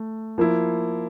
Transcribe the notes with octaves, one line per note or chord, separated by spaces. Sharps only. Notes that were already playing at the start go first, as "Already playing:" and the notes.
Already playing: A3
F3 A#3 E4